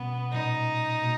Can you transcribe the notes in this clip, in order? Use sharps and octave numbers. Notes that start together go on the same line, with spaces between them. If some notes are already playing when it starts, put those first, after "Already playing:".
Already playing: B2 G3 A#3 B3 C#4
A#2 G3 C#4 D#4 E4
B2 A#3